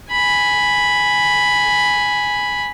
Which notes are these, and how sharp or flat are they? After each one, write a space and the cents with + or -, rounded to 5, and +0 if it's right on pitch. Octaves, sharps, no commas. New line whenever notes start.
G#5 +0 B5 +0